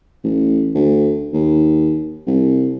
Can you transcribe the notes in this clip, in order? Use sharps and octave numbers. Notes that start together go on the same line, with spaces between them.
A1
D2
D#2
C2